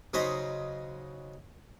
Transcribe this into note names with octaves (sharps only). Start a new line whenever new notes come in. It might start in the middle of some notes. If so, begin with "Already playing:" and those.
C#3 F#3 D#4 C5 A#5 B5